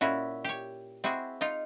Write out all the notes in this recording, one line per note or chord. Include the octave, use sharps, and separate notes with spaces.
A#2 C#4 E4 F#4
G4 C#5
C4 E4 F#4 G#4
D#4 F4